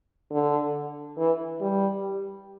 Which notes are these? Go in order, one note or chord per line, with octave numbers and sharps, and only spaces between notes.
D3
E3
G3